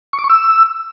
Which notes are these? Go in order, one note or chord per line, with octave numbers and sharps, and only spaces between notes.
C#6
D6
C#6
E6